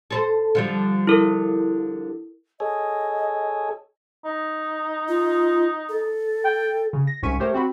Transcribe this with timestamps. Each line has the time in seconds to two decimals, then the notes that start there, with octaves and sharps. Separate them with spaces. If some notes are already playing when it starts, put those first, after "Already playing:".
0.11 A4 B4 C5
0.55 D3 F3 G3
1.07 E4 A4 A#4
2.60 G#4 A4 C#5 D#5
4.25 D#4
5.08 F4
5.89 A4
6.45 G5
6.93 C#3
7.07 A#6
7.23 C2 G#2 C#4 C#6 B6 D#7
7.40 A3 G4 A#4 C5 C#5
7.54 C4 F#4 B5